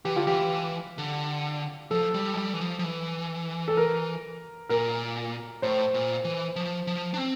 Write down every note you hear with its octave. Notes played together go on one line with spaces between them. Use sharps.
E3 G4
D3 F4
E3 G4
D3
F3 A4
G3
F3
G3
E3
F3
F3
E3
A4
A#4
A#2 A#4
A2 C5
A#2
E3
F3
F3
D4
C4